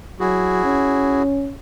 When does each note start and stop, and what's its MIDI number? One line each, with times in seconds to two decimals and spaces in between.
0.20 0.60 54
0.20 1.23 64
0.20 1.23 66
0.20 1.23 68
0.64 1.55 61